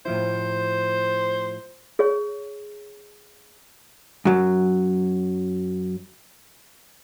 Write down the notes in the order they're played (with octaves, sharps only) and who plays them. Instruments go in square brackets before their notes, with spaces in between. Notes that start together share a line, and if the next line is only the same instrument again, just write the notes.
[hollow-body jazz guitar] A2 F3 E4 [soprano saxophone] C5
[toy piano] G#4 C#5
[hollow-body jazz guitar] F#2 F#3